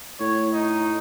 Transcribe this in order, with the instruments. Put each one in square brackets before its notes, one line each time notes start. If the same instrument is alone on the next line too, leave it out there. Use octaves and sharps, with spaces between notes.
[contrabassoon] A2 [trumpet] C#5
[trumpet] D#4